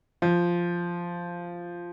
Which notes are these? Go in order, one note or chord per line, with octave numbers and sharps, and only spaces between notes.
F3